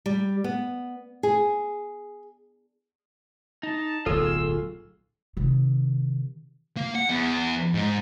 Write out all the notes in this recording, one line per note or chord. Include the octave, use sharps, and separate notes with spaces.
G3
B3
G#4
D#4 A5
D1 B1 F4 G#4 A4 E6
C3 D#3
A#3
F#5
E2
G#2